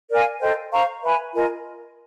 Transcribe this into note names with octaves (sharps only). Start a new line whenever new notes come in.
A#4 D5 F5 G#5
A4 C5 D#5 G5
C5 F5 A#5 C#6
B4 E5 G#5 B5
F4 A#4 D#5 G#5